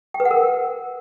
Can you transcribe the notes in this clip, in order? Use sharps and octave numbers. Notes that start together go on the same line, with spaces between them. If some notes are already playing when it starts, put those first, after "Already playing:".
G5
B4
F#5
A#4